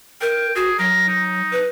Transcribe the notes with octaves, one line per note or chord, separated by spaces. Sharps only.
A#4 G5
F#4 G#4
F#3 A#4
D#4
B4